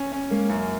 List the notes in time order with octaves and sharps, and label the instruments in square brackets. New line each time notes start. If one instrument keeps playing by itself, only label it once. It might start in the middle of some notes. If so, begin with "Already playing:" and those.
Already playing: [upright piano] C#4
C#4
[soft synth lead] G#3 [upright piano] A#3
[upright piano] F#2